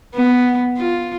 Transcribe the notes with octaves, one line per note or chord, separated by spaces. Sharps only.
B3
F4